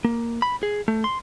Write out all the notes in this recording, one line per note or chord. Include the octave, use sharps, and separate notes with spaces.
A#3
B5
G#4
A3
C6